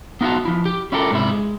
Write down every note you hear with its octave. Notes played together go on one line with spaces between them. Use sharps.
B3 D#4 F4 F#4 F5 A5
F3 E4
G4
C#4 E4 F4 G4 A4 A#4
G#2 C3 E4
G#3